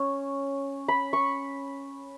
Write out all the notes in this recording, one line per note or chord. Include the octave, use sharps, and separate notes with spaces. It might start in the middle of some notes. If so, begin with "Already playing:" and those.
Already playing: C#4
B5
C#6